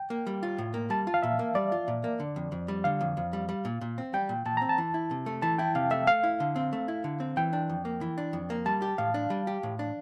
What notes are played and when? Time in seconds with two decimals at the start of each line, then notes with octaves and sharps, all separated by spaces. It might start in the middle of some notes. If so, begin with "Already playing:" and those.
Already playing: G5
0.10 A#3
0.27 G3
0.43 F4
0.58 A2
0.74 A#3
0.90 G3 A5
1.07 F4
1.14 F5
1.22 A#2 E5
1.39 A#3
1.55 G3 D5
1.72 F4
1.88 A#2
2.04 A#3
2.20 D3
2.36 F2
2.52 F2
2.68 G3
2.84 D3 F5
3.01 F2
3.17 F2
3.33 G3
3.49 G3
3.65 A#2
3.81 A#2
3.98 C4
4.14 G3 G5
4.29 A#2
4.46 A#2 A5
4.57 C4 A#5
4.69 A5
4.78 E3
4.94 E4
5.11 C3
5.26 A3
5.42 E3 A5
5.58 E4 G5
5.75 C3 F5
5.91 A3 E5
6.07 A3 F5
6.23 E4
6.40 D3
6.56 C4
6.73 A3
6.88 E4
7.04 D3
7.20 C4
7.37 E3 G5
7.53 D4
7.69 F2
7.85 A#3
8.01 E3
8.18 D4
8.33 F2
8.50 A#3
8.66 G3 A5
8.82 G4
8.98 A2 F5
9.14 D4
9.30 G3
9.47 G4
9.63 A2
9.79 D4